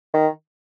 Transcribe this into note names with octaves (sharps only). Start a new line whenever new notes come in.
D#3